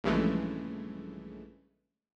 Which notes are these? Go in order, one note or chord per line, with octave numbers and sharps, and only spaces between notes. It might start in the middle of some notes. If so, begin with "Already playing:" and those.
A#1 G2 C#3 E3 G#3 A3